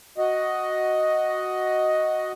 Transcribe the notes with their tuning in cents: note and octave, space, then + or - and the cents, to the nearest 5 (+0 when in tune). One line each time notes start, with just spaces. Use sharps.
F#4 +0 D#5 +5